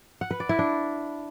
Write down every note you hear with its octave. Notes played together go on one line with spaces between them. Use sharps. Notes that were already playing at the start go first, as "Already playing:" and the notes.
F#5
B4
D5
E4
D4